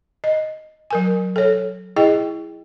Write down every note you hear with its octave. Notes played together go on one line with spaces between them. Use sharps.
D#5
F#3 A#4 G#5
A4 C#5
E4 G#4 D#5 G5